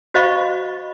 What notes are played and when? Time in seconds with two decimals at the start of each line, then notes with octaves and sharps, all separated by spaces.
0.14 F#4 C5 D#5 F5 B5 C#6